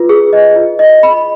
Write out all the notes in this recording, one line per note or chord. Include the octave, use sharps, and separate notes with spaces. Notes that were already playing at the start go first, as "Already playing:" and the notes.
Already playing: F4 B4
G#4
D#5
F4
D#5
B5